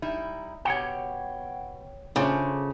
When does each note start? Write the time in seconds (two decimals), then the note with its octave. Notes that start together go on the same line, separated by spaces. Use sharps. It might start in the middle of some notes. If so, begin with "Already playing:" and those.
0.02 G3 D#4 E4
0.65 B2 G4 C#5 F#5 G5
2.16 C#3 A3 D4 F4 C5